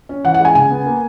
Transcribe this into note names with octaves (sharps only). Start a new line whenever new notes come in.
C#4
E3 F#5
F#5
G#3 G#5
C#3 G#5
B3
A#3